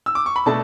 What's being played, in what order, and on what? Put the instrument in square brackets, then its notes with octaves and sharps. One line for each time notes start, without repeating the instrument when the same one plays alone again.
[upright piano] E6
D6
C#6
B5
B2 A3 D4 A5